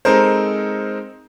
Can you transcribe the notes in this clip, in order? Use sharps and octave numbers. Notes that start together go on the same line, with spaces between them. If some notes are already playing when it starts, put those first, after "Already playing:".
G#3 C4 D#4 A4 A#4 C5